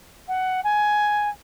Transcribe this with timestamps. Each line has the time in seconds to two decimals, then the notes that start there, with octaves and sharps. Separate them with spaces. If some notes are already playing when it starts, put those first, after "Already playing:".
0.28 F#5
0.64 G#5